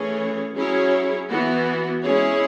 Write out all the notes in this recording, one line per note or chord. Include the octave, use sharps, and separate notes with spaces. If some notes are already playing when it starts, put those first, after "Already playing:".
Already playing: E3 A3 C#4 G#4 C#5
F#3 C#4 E4 G#4 C#5
E3 B3 F#4
G#3 C#4 E4 G#4 C#5